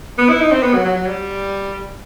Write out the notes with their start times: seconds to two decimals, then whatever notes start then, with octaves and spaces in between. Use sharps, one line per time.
0.18 B3
0.29 E4
0.40 D#4
0.52 C4
0.62 B3
0.74 F#3
0.85 F#3
0.96 F#3
1.07 G3